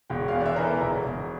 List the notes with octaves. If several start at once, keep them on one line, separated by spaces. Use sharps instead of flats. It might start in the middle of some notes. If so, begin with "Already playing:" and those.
E1 G5
E2 F5
D5
E5
E3 A#4
A4
E1 A#4
E1